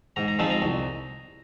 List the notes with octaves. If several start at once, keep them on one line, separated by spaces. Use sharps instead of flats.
G#2 A#5
A#5
F3 G#3 C4 D#4 A5
A#5
C2